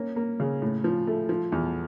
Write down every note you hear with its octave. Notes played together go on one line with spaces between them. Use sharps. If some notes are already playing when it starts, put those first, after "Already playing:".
Already playing: A#3 C#4
A#3
C#3
A2
F3
A3
F3
E2